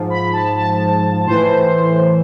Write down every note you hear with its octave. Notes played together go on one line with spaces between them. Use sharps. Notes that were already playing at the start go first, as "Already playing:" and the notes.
Already playing: G#2 F3
B5
A5
A5
A2 E3 C5